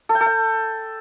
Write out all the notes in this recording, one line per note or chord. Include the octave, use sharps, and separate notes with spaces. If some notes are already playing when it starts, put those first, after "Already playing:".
A4
G5
A4
G5